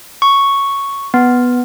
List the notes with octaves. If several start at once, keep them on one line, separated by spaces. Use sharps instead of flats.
C#6
B3